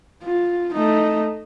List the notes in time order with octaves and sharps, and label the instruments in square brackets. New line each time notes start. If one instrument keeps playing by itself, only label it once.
[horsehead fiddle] F4
A3 D#4